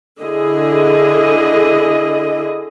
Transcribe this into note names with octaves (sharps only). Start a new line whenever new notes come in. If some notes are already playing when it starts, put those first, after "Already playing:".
D3 E4 G#4 D#5